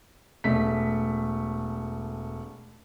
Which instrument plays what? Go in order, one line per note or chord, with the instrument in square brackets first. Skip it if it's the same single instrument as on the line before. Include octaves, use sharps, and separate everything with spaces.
[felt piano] E1 A3 B6